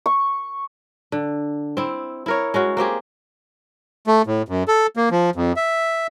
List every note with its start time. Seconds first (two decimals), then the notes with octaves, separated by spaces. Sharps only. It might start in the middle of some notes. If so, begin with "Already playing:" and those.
0.06 C#6
1.12 D3
1.77 C4 E4
2.26 E4 A#4 C#5
2.54 G#3 C#4 F#4
2.77 A#3 C4 G4 G#4
4.07 A3
4.27 A2
4.48 F#2
4.68 A4
4.97 A#3
5.11 F3
5.36 F2
5.56 E5